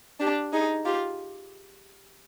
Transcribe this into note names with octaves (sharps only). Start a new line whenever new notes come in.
D4 G4
D#4 G#4
F4 G4